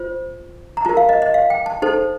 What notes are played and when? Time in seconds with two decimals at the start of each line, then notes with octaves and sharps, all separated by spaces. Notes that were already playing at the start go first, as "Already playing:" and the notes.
Already playing: F4 C5
0.77 A#5
0.85 F4 A#4 A5
0.97 F5
1.09 D#5
1.22 D#5
1.34 F5
1.50 G5
1.66 A5
1.82 D#4 A4 C5 A5